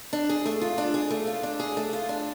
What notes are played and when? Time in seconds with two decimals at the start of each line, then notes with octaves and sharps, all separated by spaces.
0.13 D4
0.29 G#4
0.45 A3
0.61 F4
0.78 D4
0.94 G#4
1.10 A3
1.27 F4
1.43 D4
1.60 G#4
1.77 A3
1.93 F4
2.09 D4